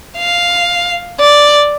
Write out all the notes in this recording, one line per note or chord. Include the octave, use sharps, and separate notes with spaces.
F5
D5